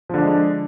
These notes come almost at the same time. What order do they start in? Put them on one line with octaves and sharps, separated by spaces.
F3 D3 D4 G#3